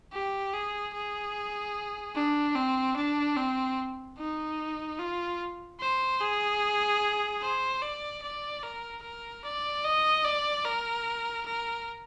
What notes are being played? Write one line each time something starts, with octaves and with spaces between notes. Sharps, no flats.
G4
G#4
G#4
D4
C4
D4
C4
D#4
F4
C5
G#4
C5
D5
D5
A#4
A#4
D5
D#5
D5
A#4
A#4